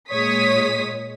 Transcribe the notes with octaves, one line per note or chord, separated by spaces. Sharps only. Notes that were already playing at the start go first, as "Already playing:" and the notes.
A#2 G#3 C#5 D#6 B6